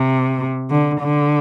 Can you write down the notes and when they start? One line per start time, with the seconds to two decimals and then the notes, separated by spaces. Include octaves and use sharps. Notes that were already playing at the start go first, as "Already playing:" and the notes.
Already playing: C3
0.70 D3
1.00 D3